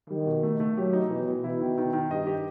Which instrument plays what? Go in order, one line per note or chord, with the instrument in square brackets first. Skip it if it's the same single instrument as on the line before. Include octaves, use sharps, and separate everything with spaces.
[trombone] D#3 [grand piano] G3
[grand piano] B2
A3
A3
[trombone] F#3 [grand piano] G4
[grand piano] D#4
[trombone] B2 [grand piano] E3
[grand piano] E3
[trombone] B2 [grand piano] E4
[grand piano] D#3
D#3
D#3
[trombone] G2 [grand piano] D#5
[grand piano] G4